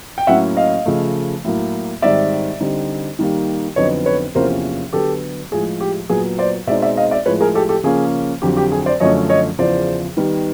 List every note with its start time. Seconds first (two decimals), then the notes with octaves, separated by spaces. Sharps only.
0.18 G5
0.27 A2 F#3 A#3 C#4 E5 F#5
0.57 D#5 F5
0.86 C#3 F3 A3
1.44 A2 F#3 A#3
2.02 G#2 D#3 G3 C4 D5 E5
2.60 D3 G3 C4 D#4
3.19 D#3 G3 A#3
3.76 F2 D3 F#3 B3 D#4 C#5 D#5
4.06 B4 C#5
4.35 E2 C3 F3 A#3 C#4 A#4 C5
4.93 D3 F#3 B3 G4 A4
5.51 A2 F3 G#3 G#4
5.81 G4
6.09 A#2 F#3 B3 G#4
6.38 C5 D5
6.67 B2 G#3 C4 D#4 D5 E5
6.82 D5 E5
6.97 D#5 F5
7.11 D5 E5
7.26 A2 F3 G#3 B4 C#5
7.41 G#4 A#4
7.55 G4 A4
7.69 G4 A4
7.84 C#3 F3 A#3 C#4 G#4
8.42 F2 D3 F#3 G4
8.57 G4
8.72 G#4
8.86 C5 D5
9.00 F#2 D3 F3 A3 C#4 C#5 D#5
9.29 C#5 D#5
9.59 E2 C#3 F3 C5 D5
10.17 D#3 G3 B3